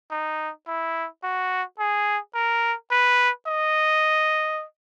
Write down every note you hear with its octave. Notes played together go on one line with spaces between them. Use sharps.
D#4
E4
F#4
G#4
A#4
B4
D#5